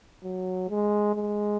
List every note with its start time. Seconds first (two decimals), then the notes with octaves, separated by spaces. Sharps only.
0.23 F#3
0.69 G#3
1.15 G#3